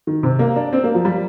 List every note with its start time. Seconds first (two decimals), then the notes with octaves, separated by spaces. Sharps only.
0.07 D#3
0.23 C3
0.39 A#3
0.56 D4
0.73 C4
0.84 A#3
0.95 F3
1.05 G3